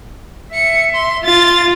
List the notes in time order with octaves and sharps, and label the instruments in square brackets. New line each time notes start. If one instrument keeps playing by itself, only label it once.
[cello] E5 [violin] C#7
[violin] C6
[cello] F4 [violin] A6